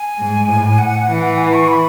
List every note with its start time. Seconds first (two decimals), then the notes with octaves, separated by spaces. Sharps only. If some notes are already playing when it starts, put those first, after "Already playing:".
Already playing: G#5
0.18 G#2
0.48 A2
0.78 F#5
1.08 E3
1.38 G#5
1.53 C#6
1.68 B5